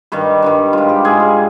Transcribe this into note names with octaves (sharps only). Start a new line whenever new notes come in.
G2 D#3 G3
G2 D#3 G3
G#2 G3 F4
G4
G#2 G3 G#4
F4